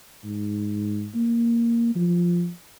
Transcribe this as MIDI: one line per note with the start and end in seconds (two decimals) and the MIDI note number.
0.24 1.09 44
1.15 1.91 58
1.96 2.50 53